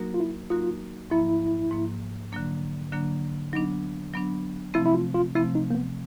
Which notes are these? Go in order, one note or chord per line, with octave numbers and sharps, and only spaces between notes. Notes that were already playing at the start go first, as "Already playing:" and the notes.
Already playing: F#3 A#3 D#4 F#4 A#4
F4
E4
F#3 A#3 D#4 F4 F#4 A#4
G#2 F3 A#3 E4
G#2 F3 A#3
D3 F#3 A#3 D4
D3 F#3 A#3 D4
F#3 B3 D4 D#4
F#3 B3 D4
C3 F3 A3 C4 E4
E4
F4
F4
C3 F3 A3 C4 E4
D#4
A#3
B3